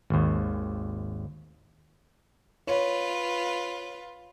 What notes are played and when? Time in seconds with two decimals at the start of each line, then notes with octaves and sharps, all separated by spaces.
0.10 G#1 D#2
2.67 F4 B4 C#5